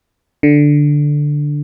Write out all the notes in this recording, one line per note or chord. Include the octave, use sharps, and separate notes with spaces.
D3